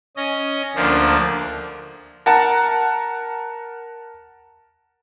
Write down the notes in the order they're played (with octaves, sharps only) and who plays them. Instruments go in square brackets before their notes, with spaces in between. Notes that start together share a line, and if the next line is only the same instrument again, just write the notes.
[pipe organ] C#4 D#5
D2 F3 A#3 D4
[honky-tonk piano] A#4 F#5 A5 A#5